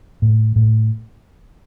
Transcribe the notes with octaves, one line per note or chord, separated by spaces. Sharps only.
A2
A2